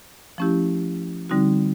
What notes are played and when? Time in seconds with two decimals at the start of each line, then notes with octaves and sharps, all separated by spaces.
0.38 F3 A3 C#4 E4 G4
1.30 D3 G3 C4 D#4 F#4